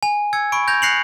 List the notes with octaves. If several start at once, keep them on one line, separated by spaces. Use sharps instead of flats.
G#5
E6 G#6 C#7
B5 C#6 D7
G6 G#6 A#6 F7
F#6 A#6 C7 C#7 F7 F#7